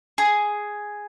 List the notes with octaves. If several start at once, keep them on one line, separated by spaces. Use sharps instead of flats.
G#4